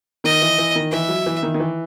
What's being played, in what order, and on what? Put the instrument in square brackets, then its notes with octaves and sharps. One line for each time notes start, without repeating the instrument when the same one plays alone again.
[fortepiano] D#3 [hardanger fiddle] D#5
[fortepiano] E3
E3
D#3
[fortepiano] E3 [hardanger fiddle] E5
[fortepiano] F#3
E3
D#3
D#3
E3